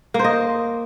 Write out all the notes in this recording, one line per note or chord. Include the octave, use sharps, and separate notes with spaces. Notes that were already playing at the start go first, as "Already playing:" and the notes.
A#3
C5
D#5